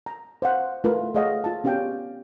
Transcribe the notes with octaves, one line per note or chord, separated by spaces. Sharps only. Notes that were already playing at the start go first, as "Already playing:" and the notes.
A#5
C5 F5 F#5
A3 F4 A#4 B4
A3 G#4 C#5 D#5 F5 F#5
F4 A5
B3 C#4 G4 F5 G5